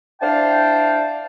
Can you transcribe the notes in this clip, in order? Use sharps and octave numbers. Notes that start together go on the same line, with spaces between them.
D4 E4 C5 F5 G5 A5